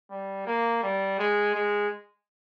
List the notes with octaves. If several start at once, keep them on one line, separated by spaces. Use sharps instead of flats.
G3
A#3
G3
G#3
G#3